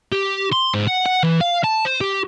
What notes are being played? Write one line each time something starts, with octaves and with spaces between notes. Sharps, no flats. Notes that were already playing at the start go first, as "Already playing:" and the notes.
G4
C6
G#2
F#5
F#5
E3
F5
A5
C5
G4